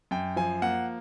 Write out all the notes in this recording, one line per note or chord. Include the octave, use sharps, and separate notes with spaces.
F#2 G5
F3 G#5
A#3 F#5